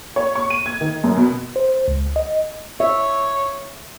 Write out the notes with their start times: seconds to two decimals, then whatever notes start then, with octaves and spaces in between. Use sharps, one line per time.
0.16 C#5
0.35 C#6
0.50 D#7
0.66 G#6
0.81 D#3
1.04 F#2
1.16 B2
1.56 C5
1.88 C#2
2.16 D#5
2.80 C#5 E5